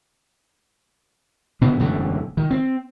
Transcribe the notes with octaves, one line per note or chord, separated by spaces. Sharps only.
B2 D3 B3
E1 F#2 D3 A3
D#3
C4